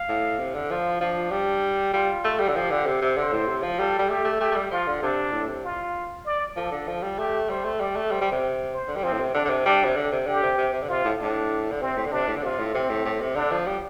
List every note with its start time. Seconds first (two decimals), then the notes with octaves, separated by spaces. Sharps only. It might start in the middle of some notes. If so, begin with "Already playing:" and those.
Already playing: F5
0.09 A2
0.39 C3
0.55 D3
0.70 F3 F4
1.00 F3 D4
1.31 G3
1.93 G3 F4
2.25 A3
2.40 G3
2.48 D3
2.56 F3 G4
2.71 D3
2.86 C3
3.02 C3
3.17 D3 C5
3.33 A2
3.47 C3
3.63 F3
3.79 G3 A4
3.99 G3
4.09 A3 G4
4.24 A3
4.40 A3 G4
4.51 A3
4.56 G3
4.71 F3 F4
4.87 D3
5.03 C3 D4
5.33 A2
5.48 C3
5.64 F4
6.26 D5
6.56 F3 A4
6.72 D3
6.88 F3
7.03 G3
7.18 A3 G4
7.49 G3 C5
7.65 A3
7.80 G3 D5
7.96 A3
8.11 G3 C5
8.21 G3
8.32 C3
8.73 C5
8.88 D3
8.96 G3
9.03 F3 C4
9.13 A2
9.19 C3
9.34 D3 D4
9.45 D3
9.49 C3
9.65 G3 D4
9.85 C3
9.96 D3
10.12 C3
10.27 D3 G4
10.43 C3
10.58 C3
10.73 C3
10.83 D3
10.88 C3 F4
11.04 A2
11.19 A2 D4
11.71 D3
11.81 C3 C4
11.97 A2
12.06 D3
12.12 C3 D4
12.28 A2
12.36 D3
12.43 C3 F4
12.59 A2
12.74 C3 C4
12.90 A2
13.05 A2
13.21 C3
13.36 D3 D4
13.51 F3
13.67 G3